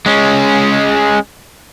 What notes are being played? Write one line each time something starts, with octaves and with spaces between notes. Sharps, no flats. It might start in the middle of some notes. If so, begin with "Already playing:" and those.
G#3 C#4